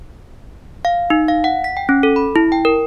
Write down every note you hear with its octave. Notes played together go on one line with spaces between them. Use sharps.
F5
D#4
F5
F#5
B6
G5
C#4
A4
B5
E4
G5
A#4